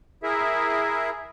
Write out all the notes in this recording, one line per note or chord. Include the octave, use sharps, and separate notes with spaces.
E4 G#4 A#4 E5